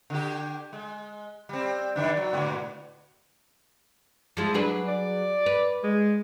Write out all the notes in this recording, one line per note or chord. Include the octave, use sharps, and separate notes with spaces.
D3 G4
G#3
G3 C4
F#2 D#3 D4
F#3
G#2 B2 D3
F3 G#3 E4
F#3 D4 G#4 B4
D5
B4
G#3